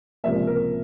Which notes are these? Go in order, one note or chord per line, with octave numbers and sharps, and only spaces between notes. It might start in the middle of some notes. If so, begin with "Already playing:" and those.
C#2 C3 F3 A#3 E5
A#4